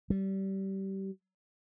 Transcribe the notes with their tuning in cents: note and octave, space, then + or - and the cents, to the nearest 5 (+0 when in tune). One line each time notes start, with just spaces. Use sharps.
G3 -25